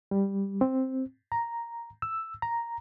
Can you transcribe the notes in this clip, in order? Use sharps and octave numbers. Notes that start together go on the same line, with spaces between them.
G3
C4
A#5
E6
A#5